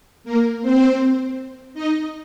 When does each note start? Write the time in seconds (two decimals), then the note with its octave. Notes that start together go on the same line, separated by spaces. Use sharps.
0.24 A#3 A#4
0.61 C4 C5
1.74 D#4 D#5